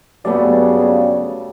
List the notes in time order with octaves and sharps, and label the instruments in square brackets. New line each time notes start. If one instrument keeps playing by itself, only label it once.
[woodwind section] G2 C#3 [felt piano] F#3 A3 B3 [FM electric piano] D5